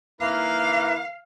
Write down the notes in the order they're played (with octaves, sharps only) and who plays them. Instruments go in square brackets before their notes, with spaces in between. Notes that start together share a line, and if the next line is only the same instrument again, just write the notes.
[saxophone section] D#3 A#3 [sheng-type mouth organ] E4 A#4 B4 [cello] F5